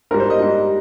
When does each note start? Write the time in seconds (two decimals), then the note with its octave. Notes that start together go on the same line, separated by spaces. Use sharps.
0.11 G#2 G3 A#4
0.20 C5
0.30 D#5
0.40 G#2 G3